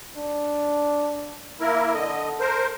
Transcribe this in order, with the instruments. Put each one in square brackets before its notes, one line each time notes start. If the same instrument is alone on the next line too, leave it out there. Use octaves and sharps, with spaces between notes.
[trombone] D4
[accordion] A#3 E4 A#4
[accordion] D3 D#5 [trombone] A4
[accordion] A#4 C5